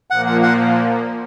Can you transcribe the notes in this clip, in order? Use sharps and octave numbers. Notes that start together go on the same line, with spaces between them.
A#2 F3 A#3 F#5
F#5
F#5